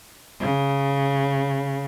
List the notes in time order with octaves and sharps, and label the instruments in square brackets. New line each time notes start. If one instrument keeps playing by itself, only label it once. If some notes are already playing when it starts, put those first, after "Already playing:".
[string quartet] C#3